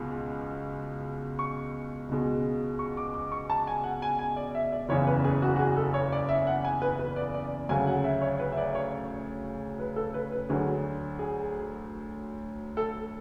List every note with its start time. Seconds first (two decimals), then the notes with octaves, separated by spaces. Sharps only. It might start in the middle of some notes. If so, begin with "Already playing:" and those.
Already playing: C#2 B2 G#3
1.39 C#6
2.09 C#2 B2 G#3
2.79 C#6
2.97 D6
3.14 D6
3.32 C#6
3.50 A5
3.67 G#5
3.84 F#5
4.02 G#5
4.19 G#5
4.36 D5
4.55 E5
4.72 D5
4.89 F#1 E2 C#3 C#5
5.07 B4
5.24 G#4
5.42 F#4
5.56 F#4
5.59 G#4
5.77 A4
5.94 C#5
6.12 D5
6.29 E5
6.47 F#5
6.64 G#5
6.82 B4
6.99 B4
7.16 D5
7.34 D5
7.69 D2 C#3 F#3 G#5
7.87 F#5
8.04 E5
8.22 C#5
8.40 B4
8.52 E5
8.57 D5
8.75 C#5
9.80 B4
9.96 A4
10.14 B4
10.32 B4
10.49 D2 D3 F#3 G#4
11.19 G#4
12.77 A4